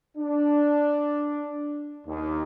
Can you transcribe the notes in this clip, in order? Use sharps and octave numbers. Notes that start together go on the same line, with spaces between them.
D4
D#2